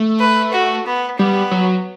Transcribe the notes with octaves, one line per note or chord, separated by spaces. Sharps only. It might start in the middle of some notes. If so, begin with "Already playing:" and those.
Already playing: A3
B4
F#4
B3
G3 B3
F#3